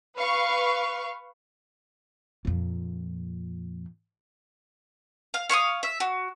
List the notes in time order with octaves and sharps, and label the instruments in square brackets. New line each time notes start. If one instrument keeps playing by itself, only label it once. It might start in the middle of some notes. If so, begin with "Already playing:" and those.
[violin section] B4 F5 C#6
[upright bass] F2 A#2
[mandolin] F5
C#5 F5 C#6 D#6
E5
F#4